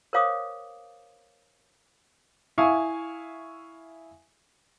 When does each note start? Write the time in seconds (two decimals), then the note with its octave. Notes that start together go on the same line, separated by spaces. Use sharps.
0.13 A#4 C5 C#5 F5 D6 D#6
2.58 E4 E5 F5 G#5 C#6 D#6